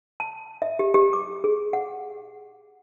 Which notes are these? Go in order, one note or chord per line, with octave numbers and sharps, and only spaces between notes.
A5
E5
G4
G4
D6
G#4
F#5